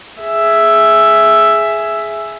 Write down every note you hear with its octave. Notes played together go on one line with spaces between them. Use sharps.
G#4 E5